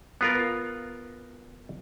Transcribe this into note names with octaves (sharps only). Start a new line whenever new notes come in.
B3 F4 A#4